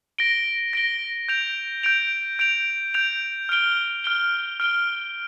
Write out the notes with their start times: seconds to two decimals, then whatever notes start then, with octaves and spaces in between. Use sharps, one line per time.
0.18 A#6 D7 G7
0.73 A#6 D7 G7
1.29 G6 D7 F7
1.83 G6 D7 F7
2.39 G6 D7 F7
2.94 G6 D7 F7
3.49 F6 D7 G7
4.04 F6 D7 G7
4.60 F6 D7 G7